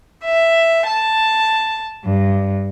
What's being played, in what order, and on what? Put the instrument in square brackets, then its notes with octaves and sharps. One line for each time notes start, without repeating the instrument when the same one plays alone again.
[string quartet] E5
A5
G2